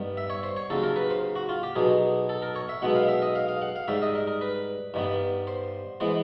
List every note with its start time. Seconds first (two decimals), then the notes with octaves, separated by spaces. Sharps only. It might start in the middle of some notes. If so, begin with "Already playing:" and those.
Already playing: G2 D#3 G3 B3
0.17 E5
0.30 C#5
0.43 C5
0.56 C#5
0.70 D#2 C#3 F#3 A4
0.83 A#4
0.96 B4
1.10 C5
1.36 F#4
1.49 F4
1.63 G4
1.76 B1 B2 F#3 G#4
2.29 A4
2.42 A#4
2.55 C#5
2.69 E5
2.82 B1 B2 G#3 B3 F#5
2.95 F5
3.08 E5
3.22 D#5
3.35 F5
3.48 F5
3.62 F#5
3.76 F5
3.88 G#2 D#3 G3 E5
4.02 D#5
4.15 A#4
4.28 A#4
4.41 B4
4.94 G2 D#3 G3 B3
5.47 C5
6.00 E3 G#3 B3 C5